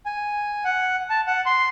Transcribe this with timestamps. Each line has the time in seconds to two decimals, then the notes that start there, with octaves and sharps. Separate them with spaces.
0.06 G#5
0.65 F#5
1.10 A5
1.27 F#5
1.46 C6